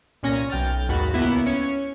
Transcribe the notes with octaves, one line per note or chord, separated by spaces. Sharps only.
C2 A#2 C#4 G#5 A#6
B1 G5 F6 A6
D#2 G#2 F#4 B5 A6
C#2 A#3 B3 E4
C#4 C#5 C#7